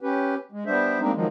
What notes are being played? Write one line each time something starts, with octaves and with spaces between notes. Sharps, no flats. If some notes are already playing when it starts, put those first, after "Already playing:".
C#4 G4 B4
G#3
G3 B3 D4 C5 E5
G3 G#3 A#3 C4 D4 D#4
D#3 F3 F#3 G#3